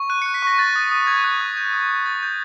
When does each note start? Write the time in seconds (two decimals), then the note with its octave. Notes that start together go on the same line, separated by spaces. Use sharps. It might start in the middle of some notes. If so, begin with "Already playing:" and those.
Already playing: C#6
0.10 F#6 D#7
0.22 C#7
0.26 F#6
0.34 B6
0.42 C#6 A#6
0.58 F#6 A6
0.76 D#6
0.91 D#6
1.07 F#6 G#6
1.24 F#6
1.41 D#6
1.57 G6
1.73 D#6
1.89 D#6
2.06 G6 A6
2.23 G6